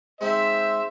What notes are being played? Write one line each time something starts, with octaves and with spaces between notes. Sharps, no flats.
G#3 C4 D#4 C5 E5